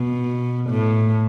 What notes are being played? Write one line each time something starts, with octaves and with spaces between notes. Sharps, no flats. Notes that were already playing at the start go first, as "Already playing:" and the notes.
Already playing: B2
A2